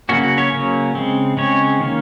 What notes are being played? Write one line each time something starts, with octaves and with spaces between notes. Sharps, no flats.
C#3 F#3 A#3 C#4 F#4
F#4
C#4 C#5
C#3 F#3 A#3 C#4
C#3 G#3 C4
C#3 G#3 C4 C#4 C#5
D#3 A#3 C#4